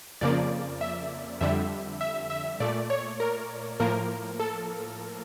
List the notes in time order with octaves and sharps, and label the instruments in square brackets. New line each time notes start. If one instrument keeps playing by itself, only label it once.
[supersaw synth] F2 C#3 F3 A#3 D5
E5
F2 D3 G3 E5
E5
E5
A#2 A3 D5
C#5
A#4
A2 F3 A#3 A#4
A4